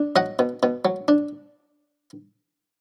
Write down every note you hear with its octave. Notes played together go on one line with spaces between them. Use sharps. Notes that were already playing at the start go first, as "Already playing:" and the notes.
Already playing: D4
F#3 D#5 F#5
B2
B2
F#3
D4